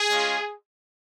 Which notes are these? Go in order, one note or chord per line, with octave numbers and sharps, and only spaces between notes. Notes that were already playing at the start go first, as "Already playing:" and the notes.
Already playing: G#4
G#3 C#4 F4